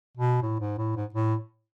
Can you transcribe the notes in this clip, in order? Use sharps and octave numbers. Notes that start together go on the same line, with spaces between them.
B2
A2
G#2
A2
G#2
A2